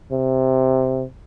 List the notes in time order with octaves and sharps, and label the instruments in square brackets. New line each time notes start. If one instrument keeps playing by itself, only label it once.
[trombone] C3